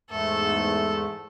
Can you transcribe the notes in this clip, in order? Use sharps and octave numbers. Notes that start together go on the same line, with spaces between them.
E2 G#2 A3 A4